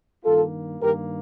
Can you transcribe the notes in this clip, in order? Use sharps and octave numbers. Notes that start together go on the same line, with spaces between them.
G2 D#3 A#3 F4 A4
G2 D#3 A#3 G4 A#4